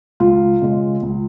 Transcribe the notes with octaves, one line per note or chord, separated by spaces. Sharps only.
C#2 F4
C#3 G#3
C#2